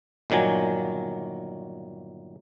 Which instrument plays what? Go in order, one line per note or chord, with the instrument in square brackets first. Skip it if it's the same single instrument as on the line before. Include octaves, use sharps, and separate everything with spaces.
[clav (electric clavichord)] G1 A#2 D#3 F#3 G#5